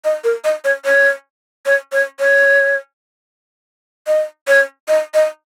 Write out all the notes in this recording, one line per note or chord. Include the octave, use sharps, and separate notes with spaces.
D#5
A#4
D#5
C#5
C#5
C#5
C#5
C#5
D#5
C#5
D#5
D#5